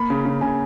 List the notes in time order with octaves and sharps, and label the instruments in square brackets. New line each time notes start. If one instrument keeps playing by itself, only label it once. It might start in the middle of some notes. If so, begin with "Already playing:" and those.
Already playing: [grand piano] A#3 B5
C#3
C#3
C#3 G#5